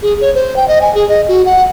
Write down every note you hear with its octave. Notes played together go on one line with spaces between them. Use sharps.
G#4
C#5
C5
G5
D#5
G#5
G#4
D#5
F#4
F#5